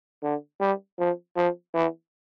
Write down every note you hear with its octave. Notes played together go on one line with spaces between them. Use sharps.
D3
G3
F3
F3
E3